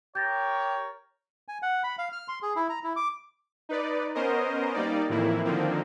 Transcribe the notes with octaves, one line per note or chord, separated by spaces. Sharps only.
G4 A#4 C#5 G6 A6 A#6
G#5
F#5
B5
F5
F6
C6
G#4
E4
A#5
E4
D6
D#4 B4 D5
B3 C#4 A#4 C5 D#5
G3 A#3 D#4 D5
F2 A2 D#3 E3 A#3 E4
D3 D#3 F3 A#3 C4